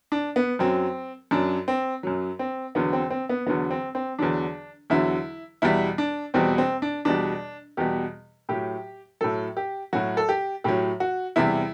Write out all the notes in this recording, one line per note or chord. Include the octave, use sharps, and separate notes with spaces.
D4
B3
F#2 F#3 C4
F#2 F#3 D4
C4
F#2 F#3
C4
E2 D3 F#3 B3
C4
C4
B3
E2 D3 F#3 B3
C4
C4
E2 D3 F#3 D4
E2 D3 F#3 E4
E2 B2 G3 E4
D4
E2 B2 G3 C4
C4
D4
E2 B2 G3 D4
E2 B2 G3 G4
A2 F#3 G4
A2 F#3 A4
G4
A2 F#3 F#4
A4
G4
A2 F#3 G4
F#4
E2 C3 G3 E4